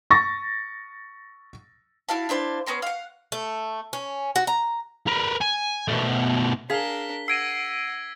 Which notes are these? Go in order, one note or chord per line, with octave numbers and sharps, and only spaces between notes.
C#6 A6 A#6
E4 F#4 F5 A5
D4 E4 C5 F5
B3 C#4 A#5 C6
F5 F#5
A3
C#4
F#4
A#5
A#4 B4
G#5
B2 A3
D4 G#4 A#4 F5 B6 G7
F#5 E6 G#6 A#6 C7 D7 D#7